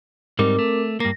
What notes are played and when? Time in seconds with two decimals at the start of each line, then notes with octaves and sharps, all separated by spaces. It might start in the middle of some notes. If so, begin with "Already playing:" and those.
0.39 G#2 G3 C4 D#4 A#4 D6
0.59 A3
1.00 G2 A#3 A#6